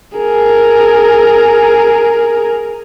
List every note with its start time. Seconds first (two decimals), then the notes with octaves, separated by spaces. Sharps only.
0.17 G#4 A#4